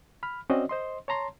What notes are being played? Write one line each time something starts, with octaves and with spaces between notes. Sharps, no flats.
B5 F6
C4 C#4 F#4 C5 D5 D#5
C5 D#5 C6
C#5 A5 A#5 C6